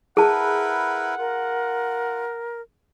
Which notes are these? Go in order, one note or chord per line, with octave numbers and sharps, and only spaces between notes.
E4 G#4 A#4 B4 F#5 A5
F4 A#4